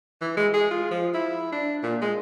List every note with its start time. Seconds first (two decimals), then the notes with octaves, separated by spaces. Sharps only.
0.21 E3
0.37 G#3
0.54 G#4
0.71 F4
0.91 F3
1.14 E4
1.52 D4
1.83 A#2
2.01 G#3